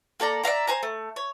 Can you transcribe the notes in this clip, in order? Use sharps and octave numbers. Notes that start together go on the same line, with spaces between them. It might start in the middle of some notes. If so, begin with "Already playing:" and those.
A#3 A4 D5 A#5
D5 E5 F5 A#5
C5 G#5 A#5
A3
C#5